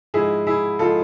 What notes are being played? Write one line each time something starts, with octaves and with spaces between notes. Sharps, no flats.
G#2 F3 G#3 E4 G#4
E4 G#4
F3 G#3 F4 A4